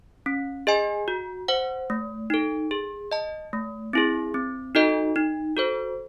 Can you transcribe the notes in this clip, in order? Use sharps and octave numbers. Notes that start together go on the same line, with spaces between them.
C#4
G#4 D#5 G#5
F#4
C5 F#5
A3
D#4 A4
G#4
D#5 A5
A3
C4 E4 G#4
C4
D#4 F#4 A4 D#5
D#4
F#4 A4 C5